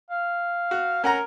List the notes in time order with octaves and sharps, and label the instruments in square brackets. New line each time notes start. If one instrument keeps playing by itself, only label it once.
[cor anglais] F5
[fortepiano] F#4
[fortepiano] C#4 F#5 A#5 [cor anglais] A#4